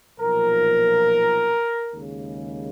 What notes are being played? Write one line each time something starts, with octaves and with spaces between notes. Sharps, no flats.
B1 A#2 F3 A#4
D#2 C#3 G#3